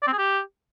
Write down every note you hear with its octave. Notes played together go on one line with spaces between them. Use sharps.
D5
C4
G#4
G4